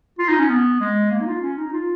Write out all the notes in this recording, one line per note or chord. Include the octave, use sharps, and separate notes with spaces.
F4
D#4
C#4
B3
G#3
A#3
D#4
F4
C#4
D#4
F4